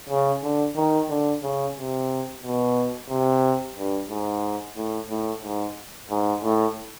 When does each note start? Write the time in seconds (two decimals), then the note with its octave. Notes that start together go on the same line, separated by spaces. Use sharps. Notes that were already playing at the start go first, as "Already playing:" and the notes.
0.09 C#3
0.43 D3
0.76 D#3
1.09 D3
1.43 C#3
1.77 C3
2.43 B2
3.09 C3
3.76 G2
4.10 G#2
4.77 A2
5.10 A2
5.44 G#2
6.10 G#2
6.43 A2